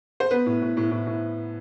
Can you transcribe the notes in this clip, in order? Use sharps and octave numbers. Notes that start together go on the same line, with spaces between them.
C5
B3 B4
A2
A2
A2
A2
A2